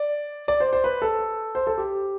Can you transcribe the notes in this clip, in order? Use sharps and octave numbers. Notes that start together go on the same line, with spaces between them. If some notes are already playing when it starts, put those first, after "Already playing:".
Already playing: D5
D5
C5
C5
B4
A4
C5
A4
G4